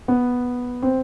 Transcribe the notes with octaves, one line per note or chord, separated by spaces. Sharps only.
B3
C4